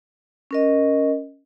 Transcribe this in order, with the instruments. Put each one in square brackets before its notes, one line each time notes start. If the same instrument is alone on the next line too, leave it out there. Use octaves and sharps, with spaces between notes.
[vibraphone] C#4 A#4 D#5